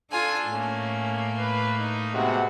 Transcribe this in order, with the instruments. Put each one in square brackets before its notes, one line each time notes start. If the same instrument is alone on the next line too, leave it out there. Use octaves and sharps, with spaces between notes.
[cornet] D4 [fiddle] F4 G#5 [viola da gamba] A4
[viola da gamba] A2 [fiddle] A3 A#3 [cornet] C#4
[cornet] B4
D#4
[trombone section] C3 G#3 B3 [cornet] F#4